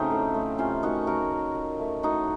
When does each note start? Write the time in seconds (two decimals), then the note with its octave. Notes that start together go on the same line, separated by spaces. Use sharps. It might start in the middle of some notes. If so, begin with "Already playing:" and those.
Already playing: C#3 F#3 A3 C4 D#4
0.11 A2
0.34 A3
0.58 C3 C#4 F4
0.83 D#3 A3 D#4 F#4
1.07 C#3 F#4 A#4
1.31 F#3 A#3
1.55 A#2
1.79 A3
2.03 A2 D#4 F#4